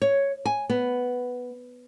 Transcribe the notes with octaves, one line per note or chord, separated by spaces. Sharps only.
C#5
G#5
B3